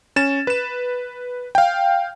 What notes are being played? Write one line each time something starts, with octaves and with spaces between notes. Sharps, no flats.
C#4 A6 E7
B4 E7
F5 G5